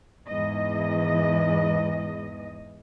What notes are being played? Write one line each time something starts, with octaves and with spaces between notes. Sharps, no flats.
E2 G#2 E3 D#5